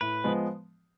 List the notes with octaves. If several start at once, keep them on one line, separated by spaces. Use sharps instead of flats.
A2 B4
F3 G#3 B3